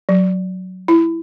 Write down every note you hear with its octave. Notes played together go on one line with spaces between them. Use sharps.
F#3
E4